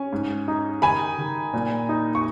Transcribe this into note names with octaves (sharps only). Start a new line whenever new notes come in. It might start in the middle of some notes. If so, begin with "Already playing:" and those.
Already playing: C#4 G#5
G#2
D#4
D#3 G#5 B5
D#3
A#2
D#4
C#6